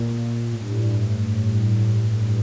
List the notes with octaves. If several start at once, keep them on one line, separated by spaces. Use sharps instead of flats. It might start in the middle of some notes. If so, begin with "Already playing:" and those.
Already playing: A#2
A2
G2
A2
G2